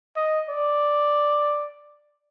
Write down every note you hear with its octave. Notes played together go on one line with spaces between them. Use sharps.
D#5
D5